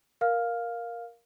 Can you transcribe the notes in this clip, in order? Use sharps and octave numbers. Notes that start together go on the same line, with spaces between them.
A#4 F5 F6